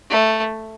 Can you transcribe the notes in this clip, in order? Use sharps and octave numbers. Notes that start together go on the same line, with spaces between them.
A3